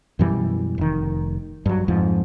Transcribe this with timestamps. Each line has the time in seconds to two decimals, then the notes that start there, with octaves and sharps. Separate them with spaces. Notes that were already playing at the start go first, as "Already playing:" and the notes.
0.19 F#2 B2 E3 G3
0.78 F1 D#3
1.66 G2 F#3
1.88 F2 G#2 F3